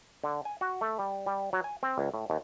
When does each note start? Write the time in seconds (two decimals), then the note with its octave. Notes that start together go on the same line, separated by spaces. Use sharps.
0.24 D3
0.45 G#5
0.61 F#4
0.81 A3
0.99 G3
1.26 G3
1.53 F#3
1.64 G#5
1.83 C4
1.98 C#2
2.14 A2
2.30 D#2